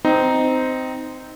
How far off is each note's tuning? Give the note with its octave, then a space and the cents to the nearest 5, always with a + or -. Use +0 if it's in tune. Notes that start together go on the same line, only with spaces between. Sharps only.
C4 -15 D#4 +0